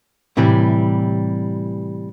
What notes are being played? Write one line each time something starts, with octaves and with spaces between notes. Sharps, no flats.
A2 C3 E3 G3